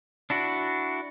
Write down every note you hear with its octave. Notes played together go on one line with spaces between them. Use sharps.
D4 E4 F#4